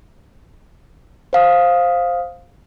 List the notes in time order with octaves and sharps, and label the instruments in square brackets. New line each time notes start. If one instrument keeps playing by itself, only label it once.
[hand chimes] C5 F5 D#6